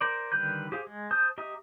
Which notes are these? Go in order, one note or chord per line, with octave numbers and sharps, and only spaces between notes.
A#4 C5 D5
D3 D#3 G3 B4 G6
G4 G#4 C5 F5
G#3
C5 A5 D#6 G6
G4 D#5 E5 A#5 D#6